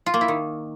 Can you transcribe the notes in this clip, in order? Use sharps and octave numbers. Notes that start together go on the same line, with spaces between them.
F4
A#3
E4
D#3